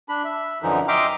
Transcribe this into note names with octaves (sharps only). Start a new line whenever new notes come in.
D4 B5
E5
F#2 D3 E3 F3 D#4
D#5 E5 G5 C6 D6 F6